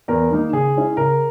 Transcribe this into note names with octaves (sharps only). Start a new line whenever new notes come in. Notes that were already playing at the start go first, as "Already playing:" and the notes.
E2 A#4
D#3 A#3 D#4
C#3 G#4
G#3 C#4 E4
C#3 A#4